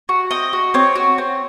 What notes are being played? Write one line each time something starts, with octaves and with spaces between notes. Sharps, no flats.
F#4
C4 D#5
F#4
C4 C#5
F#4
C4